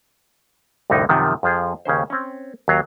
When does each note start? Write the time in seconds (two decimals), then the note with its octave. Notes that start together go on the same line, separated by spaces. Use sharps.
0.90 C2 F2 A2 D3 D#4
1.09 F#2 C3 D#3 F3
1.43 F2 F3 G#4
1.85 D#2 C#3 C#4 C5
2.10 C4 C#4
2.68 D#2 F#3 F5